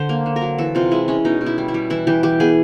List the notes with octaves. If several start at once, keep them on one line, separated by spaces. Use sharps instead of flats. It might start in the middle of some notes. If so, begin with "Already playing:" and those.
Already playing: D3 C5
A#3
D3
A#4
F#3
E3 A4
C3 F4
G#3 E4
G#3 C#4
B2 D#4
B2
E4
G3
E4
G3
E3 E4
E3 G4
E3 G4
B3 G#4